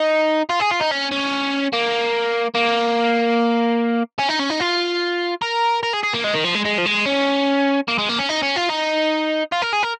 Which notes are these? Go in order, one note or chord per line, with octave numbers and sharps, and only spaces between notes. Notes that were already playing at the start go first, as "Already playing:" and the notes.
Already playing: D#4
F4
G#4
F4
D#4
C#4
C#4
A#3
A#3
C#4
D#4
C#4
D#4
F4
A#4
A#4
G#4
G#4
A#3
G#3
D#3
F3
G#3
G#3
F3
G#3
C#4
A#3
G#3
A#3
C#4
D#4
C#4
F4
D#4
F4
A#4
G#4
A#4